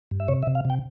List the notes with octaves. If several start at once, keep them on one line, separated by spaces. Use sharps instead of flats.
G2
E5
C3 C#5
E5
C3
F5
C3 G5